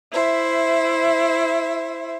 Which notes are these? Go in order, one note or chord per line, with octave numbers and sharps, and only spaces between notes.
E4 C5 E5